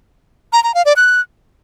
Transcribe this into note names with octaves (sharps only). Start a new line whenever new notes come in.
A#5
A#5
F5
D5
F#6